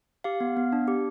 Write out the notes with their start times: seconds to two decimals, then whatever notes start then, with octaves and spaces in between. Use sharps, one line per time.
0.24 G4 F5
0.40 B3
0.57 B3
0.73 D4
0.88 G4